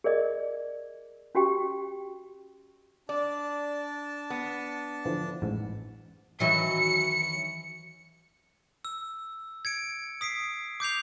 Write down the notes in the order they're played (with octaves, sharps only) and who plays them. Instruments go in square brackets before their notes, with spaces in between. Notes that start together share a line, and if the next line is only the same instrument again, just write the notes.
[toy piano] G#4 A#4 D5 D#5
C#4 F#4 G4 G5
[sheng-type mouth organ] D4 A5 [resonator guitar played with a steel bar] D5
[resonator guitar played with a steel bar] B3
[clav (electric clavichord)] D3 E3 F3
A1 G#2
[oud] D#3 E3 F#3 [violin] C#7
[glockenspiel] E6
G#6 C#7 D7
D#6 B6 C7 D7
D6 G6 C7 F7